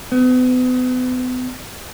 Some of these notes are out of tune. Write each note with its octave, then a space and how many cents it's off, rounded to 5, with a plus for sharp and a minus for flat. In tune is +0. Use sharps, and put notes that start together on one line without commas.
B3 +40